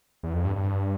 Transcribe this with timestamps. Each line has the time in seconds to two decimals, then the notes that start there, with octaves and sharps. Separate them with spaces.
0.23 E2
0.34 F2
0.45 G2
0.56 G2